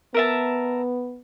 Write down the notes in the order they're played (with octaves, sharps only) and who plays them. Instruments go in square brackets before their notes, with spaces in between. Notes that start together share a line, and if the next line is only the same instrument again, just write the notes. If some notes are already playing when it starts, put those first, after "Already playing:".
[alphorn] B3 [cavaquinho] A#4 E5 A5